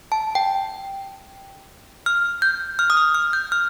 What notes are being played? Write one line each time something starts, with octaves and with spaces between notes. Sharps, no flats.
A5
G5
F6
G6
F6
D#6
F6
F6
G6
F6